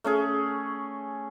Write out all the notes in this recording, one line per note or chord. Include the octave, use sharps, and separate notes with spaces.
A3 C#4 G#4